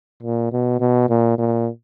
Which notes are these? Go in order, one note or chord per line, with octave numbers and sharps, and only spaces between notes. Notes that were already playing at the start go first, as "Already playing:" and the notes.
A#2
B2
B2
A#2
A#2